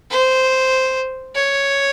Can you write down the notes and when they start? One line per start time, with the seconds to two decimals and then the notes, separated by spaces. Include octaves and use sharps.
0.10 C5
1.35 C#5